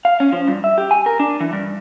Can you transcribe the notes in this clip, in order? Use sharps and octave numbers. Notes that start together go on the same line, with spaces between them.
F5
C#4
F3
G2
E5
G4
G#5
A#4
D4
E3
G2